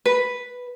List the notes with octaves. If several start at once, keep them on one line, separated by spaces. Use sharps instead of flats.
B4